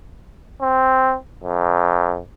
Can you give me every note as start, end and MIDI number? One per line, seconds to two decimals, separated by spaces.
0.61 1.15 60
1.44 2.19 41